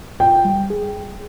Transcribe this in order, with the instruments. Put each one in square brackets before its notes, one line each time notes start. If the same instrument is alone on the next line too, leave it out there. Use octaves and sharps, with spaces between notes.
[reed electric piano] F4 [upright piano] G5
[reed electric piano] G3
G#4